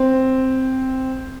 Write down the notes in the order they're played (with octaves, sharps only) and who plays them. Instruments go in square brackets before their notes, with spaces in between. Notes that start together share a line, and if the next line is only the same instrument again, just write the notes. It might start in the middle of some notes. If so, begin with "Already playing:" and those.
Already playing: [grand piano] C4